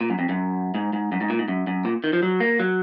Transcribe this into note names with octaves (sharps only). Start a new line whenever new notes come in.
A#2
F#2
F2
F#2
G#2
G#2
F#2
G#2
A#2
G#2
F#2
F#2
A#2
D#3
F3
F#3
A#3
F#3